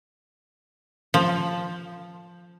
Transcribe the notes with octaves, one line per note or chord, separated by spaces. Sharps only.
F3